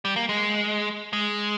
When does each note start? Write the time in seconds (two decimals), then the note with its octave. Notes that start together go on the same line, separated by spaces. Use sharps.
0.05 G3
0.16 A#3
0.29 G#3
1.13 G#3